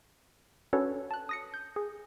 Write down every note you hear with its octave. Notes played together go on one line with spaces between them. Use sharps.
C#4 D4 F#4 A4 B4 C#5
A5 F#6
D#6 A#6 C#7
G6
G#4